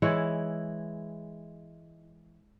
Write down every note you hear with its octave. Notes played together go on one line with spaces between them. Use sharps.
E3 G#3 E4 C#5